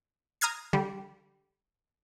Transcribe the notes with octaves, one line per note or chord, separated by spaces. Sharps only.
A#5 D#6 F6 G#6 C7
D3 G3